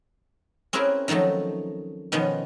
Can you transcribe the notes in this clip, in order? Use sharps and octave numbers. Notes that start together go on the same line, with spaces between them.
C4 C#4 E4 G#4 A#4 B4
D#3 F3 F#3 A3 D#4
B2 D#3 F3 B3 C#4